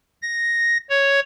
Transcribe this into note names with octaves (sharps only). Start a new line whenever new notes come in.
A#6
C#5